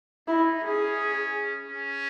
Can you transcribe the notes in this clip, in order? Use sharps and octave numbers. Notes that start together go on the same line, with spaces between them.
D#4 E4
C#4 G#4
C#4